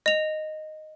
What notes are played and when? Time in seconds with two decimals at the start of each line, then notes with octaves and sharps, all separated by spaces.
0.06 D#5 F7